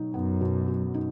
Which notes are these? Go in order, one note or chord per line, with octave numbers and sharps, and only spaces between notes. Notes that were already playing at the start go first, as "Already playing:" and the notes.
Already playing: B2 F#3 D#4
F#2 B3
B2
F#3
D#4